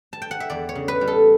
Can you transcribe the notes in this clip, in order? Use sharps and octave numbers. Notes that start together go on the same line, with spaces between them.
A5
G5
F#5
E5
E2 D5
C#5
C#3
B4
G3
A4